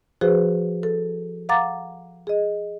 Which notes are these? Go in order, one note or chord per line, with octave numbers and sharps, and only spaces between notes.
F3 F#4 G#4 B4 C5
A4
F5 F#5 A#5 D6 A6
G#4 D#5